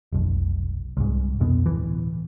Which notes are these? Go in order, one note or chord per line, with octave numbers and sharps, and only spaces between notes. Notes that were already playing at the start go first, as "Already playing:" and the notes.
F1 B1
C2 G#2
F2 B2 B3
D1 G#1 E3